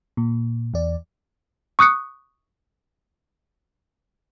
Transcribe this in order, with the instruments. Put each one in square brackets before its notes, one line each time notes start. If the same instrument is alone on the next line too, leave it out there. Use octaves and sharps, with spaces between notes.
[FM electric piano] A#2
E2 D5
[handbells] C#6 D#6 F#6 C#7